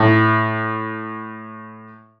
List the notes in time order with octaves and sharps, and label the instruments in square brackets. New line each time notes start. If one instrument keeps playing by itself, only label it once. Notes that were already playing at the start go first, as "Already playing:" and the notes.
Already playing: [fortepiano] A2